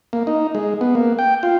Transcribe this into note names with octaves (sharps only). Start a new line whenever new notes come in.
A#3
D#4
G#3
B3
A#3
G5
F4